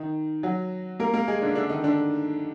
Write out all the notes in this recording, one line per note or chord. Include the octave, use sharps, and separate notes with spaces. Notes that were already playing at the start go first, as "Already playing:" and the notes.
Already playing: D#3 D#4
F#3 F#4
A#3 A#4
A#3 A#4
G#3 G#4
D3 D4
D3 D4
D#3 D#4
D3 D4